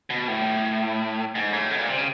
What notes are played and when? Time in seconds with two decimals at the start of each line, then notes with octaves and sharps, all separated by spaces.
0.10 B2
0.28 A2
1.35 G#2
1.53 A2
1.71 B2
1.80 A#2
1.88 C3
1.98 C#3